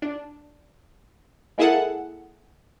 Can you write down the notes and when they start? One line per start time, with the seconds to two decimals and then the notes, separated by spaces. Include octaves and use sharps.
0.02 D4
1.58 G#3 A#3 E4 G#4 A4 F#5